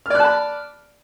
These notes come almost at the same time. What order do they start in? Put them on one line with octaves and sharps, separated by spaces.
F6 D5 F#6 A5 B5